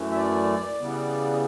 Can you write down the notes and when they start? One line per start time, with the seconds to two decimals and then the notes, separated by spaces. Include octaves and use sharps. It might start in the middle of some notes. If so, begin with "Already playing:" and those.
Already playing: F#2 E3 A3
0.11 E5
0.16 D5
0.80 C#3 E3 G3 B3